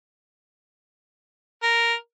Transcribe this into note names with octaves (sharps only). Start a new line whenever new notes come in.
A#4